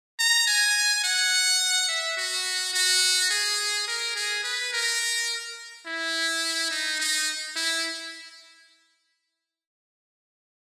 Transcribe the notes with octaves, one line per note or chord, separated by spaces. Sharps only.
A#5
G#5
F#5
E5
F#4
F#4
G#4
A#4
G#4
B4
A#4
E4
D#4
D#4
E4